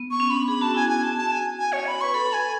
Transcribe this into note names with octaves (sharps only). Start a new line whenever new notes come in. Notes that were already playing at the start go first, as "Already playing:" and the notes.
Already playing: B3
C#6
C#4
D4 B5
G#4 B5
F#4 A5
E4 G#5
F#4 G#5
A5
A5
G#5
G#5
C#5
B5
B4 C#6
A4 B5
G#5